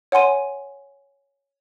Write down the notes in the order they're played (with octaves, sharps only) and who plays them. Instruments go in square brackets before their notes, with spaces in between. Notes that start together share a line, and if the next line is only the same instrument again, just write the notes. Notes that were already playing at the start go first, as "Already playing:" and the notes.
[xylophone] C#5 F#5 G#5 C6 D#7